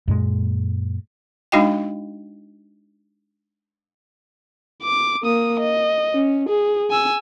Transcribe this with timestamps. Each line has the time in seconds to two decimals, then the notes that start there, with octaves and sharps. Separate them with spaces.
0.08 F#2 A#2 G#3
1.52 G#3 D4 D#4 F#4 D#5 G5
4.82 D6
5.23 A#3 D#6
5.60 D#5
6.14 C#4
6.49 G#4
6.90 G#5 E6